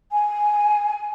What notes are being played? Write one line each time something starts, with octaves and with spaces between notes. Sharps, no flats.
G#5